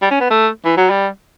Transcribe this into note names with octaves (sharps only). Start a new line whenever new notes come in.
G3
C#4
B3
A3
E3
F#3
G3